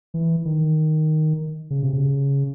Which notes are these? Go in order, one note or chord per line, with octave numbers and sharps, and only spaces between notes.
E3
D#3
C#3
C3
C#3